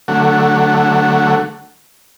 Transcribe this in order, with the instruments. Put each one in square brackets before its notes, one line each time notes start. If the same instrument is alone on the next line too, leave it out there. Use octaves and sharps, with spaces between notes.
[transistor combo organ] D3 F#3 A3 F#5